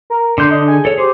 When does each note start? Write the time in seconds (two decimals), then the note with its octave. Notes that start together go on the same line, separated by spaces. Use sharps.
0.10 A#4
0.38 D3 D4 C6 G6
0.51 D4 D#5
0.68 G#4 G#5
0.85 A4 C#5
0.98 G4 G#4 C5